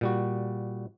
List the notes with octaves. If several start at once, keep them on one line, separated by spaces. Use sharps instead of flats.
A#2 G3 F#4